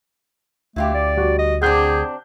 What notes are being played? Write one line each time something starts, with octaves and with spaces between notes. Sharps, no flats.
D2 A3 E4 F4 G4
D5
G3 F#4
D#5
C3 C4 D4 G#4 F#5 G6